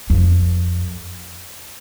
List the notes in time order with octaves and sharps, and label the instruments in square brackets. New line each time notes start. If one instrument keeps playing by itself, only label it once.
[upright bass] F2